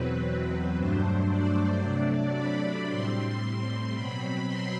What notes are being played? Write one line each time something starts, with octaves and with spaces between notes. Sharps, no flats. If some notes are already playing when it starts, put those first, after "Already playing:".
Already playing: E2 B2 F#3 C4 B4
G2 F#3 A3 D4 C5
D5
C3 F#3 A3 D4
B5
A2 G3 C4 C6
B2 F#3 C4 B5
C6